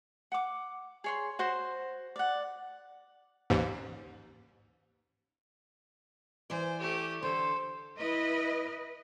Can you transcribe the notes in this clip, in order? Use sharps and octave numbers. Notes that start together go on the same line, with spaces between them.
F#5 D6
G#4 C#5 C6
F#4 C5 C6
D5 F#5
A1 D#2 G#2
E3 C5 D5
A3 G4
D3 A4 C5
E4 B4 D#5